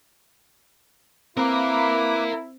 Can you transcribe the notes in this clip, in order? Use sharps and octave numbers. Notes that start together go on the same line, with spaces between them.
A#3 C4 E4 A#4 B4 F5 D6